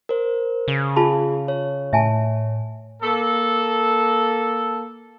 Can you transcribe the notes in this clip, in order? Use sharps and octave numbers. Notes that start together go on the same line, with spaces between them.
A#4 C5
C#3
F4 G#4 A5 B5
C#5
A2 E5 G#5 A5
A#3 A4